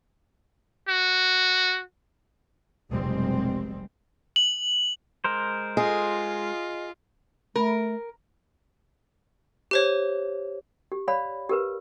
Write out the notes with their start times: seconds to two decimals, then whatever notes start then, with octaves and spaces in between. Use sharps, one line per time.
0.88 F#4
2.91 F1 B1 G3 G#3 C4
4.36 F#7
5.24 G#3 A#4 C5
5.77 F4 G#4 D#5
7.55 A3 A#4
9.71 G4 C5 C#5
10.92 G4
11.08 C#5 D5 F5 B5
11.49 G4 A#4 B4